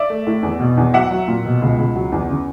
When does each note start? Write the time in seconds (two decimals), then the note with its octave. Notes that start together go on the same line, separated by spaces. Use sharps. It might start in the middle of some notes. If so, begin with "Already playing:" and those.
Already playing: D5 E5
0.10 A3
0.27 A2
0.43 E2
0.59 B2
0.77 E2
0.94 F#3 E5 F#5
1.11 F#3
1.28 A#2
1.45 B2
1.62 C#2
1.78 C#2
1.95 F#3
2.12 E2
2.29 C#3